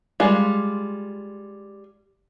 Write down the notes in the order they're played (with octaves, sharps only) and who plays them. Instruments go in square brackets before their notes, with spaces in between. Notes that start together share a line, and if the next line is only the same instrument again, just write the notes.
[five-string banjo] G3 G#3 F4